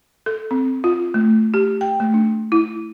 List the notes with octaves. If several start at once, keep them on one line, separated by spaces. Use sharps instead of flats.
A4
C4
F4
A3
G4
G5
A3
D4
E4